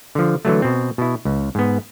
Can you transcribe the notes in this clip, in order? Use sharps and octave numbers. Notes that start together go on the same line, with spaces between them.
D3 F3
D3 E3 F#3 A3
B2 C4
B2 E4
C#2
G#2 B3